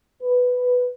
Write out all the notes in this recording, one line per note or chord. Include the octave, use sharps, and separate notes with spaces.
B4